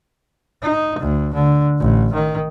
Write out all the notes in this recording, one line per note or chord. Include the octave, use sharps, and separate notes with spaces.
D#4
D2
D3
A1
D#3